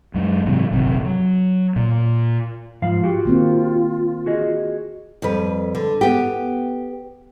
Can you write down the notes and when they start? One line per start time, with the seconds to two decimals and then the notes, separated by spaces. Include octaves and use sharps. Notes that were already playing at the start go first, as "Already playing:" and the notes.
0.14 F#2 G#3
0.46 G#2 C3 E3 F#3
0.72 D#1 G#1 F#2 C3
1.05 F#3
1.76 A#2
2.82 G#2 F3 F4 F5
3.04 F#4 G4
3.25 D#3 A#3 C4
4.26 F#4 G#4 D#5
5.22 F2 G3 B4
5.75 D3
6.01 B3 G4